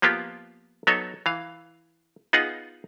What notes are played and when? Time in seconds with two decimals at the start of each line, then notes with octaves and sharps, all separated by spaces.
0.02 F3 A#3 B3 F4 G4
0.87 F#3 B3 D#4 A4 C#5
1.26 E3 F5
2.33 B3 D#4 F4 G#4 F#5